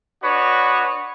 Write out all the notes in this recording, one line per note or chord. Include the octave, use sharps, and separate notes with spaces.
D4 F#4 B4 C#5 D#5